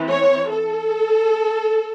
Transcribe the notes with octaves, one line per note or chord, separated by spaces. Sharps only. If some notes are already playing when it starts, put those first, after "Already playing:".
Already playing: E3 C4
C#5
A4